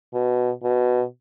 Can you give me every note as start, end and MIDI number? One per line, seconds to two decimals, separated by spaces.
0.14 0.51 47
0.63 1.03 47